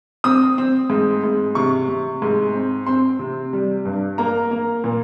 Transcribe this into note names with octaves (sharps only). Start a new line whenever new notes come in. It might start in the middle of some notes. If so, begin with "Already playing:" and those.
C4 D#6
C4
G#2
G#2
C3 C#6
C3
G#2
C4
C4 C6
C3
G3
G2
A#3 A#5
A#3
A#2